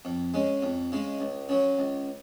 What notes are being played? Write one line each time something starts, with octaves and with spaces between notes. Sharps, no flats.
F2
C#3 G#3
F2
C#3 G#3
C#2
C#3 F#3
C#2